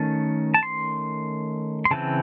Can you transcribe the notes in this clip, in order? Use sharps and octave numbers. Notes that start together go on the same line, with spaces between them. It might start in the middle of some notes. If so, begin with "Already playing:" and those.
Already playing: D#3 A3 C#4 A5
A5
C6
C6
C#3 E3 C4 A5